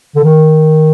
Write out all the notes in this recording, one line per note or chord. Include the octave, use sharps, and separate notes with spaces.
D3
D#3